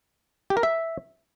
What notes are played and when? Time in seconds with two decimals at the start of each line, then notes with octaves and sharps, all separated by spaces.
0.50 G4
0.57 A#4
0.63 E5